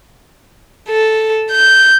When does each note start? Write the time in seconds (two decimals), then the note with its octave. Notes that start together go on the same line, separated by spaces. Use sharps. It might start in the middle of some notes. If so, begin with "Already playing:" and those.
0.89 A4
1.52 G6